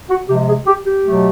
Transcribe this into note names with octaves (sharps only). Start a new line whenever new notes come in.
F#4
C3 F3 G#3 G4
G#4
G4
G4
B2 F#3 A3